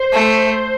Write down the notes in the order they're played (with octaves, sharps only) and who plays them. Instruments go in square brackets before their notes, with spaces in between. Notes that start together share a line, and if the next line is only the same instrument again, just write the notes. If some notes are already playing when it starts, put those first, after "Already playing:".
Already playing: [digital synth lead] C5
[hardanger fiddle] A3